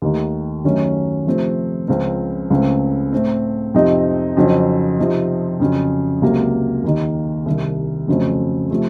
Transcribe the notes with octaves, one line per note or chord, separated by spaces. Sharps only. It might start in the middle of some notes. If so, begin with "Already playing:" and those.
D#2 D#3 A3
F#2 D#3 F#3 A3 C#4
C3 F3 A3 C4
C#2 C#3 F3 C4
C#2 C#3 A3 C4
A2 A3 C4
F2 C3 F3 C4 D#4
F2 C#3 F#3 C4 D#4
C3 F3 C4 D#4
F2 C#3 F#3
C#2 C3 F#3 A#3
D#2 D#3 A#3 D#4
C2 C3 D#3
F2 C#3 F#3 A3 C4
C3 F3 A3